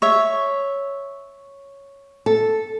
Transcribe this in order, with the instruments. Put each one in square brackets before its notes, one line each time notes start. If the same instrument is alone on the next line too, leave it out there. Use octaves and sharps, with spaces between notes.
[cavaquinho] C#5 E5
[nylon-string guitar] A4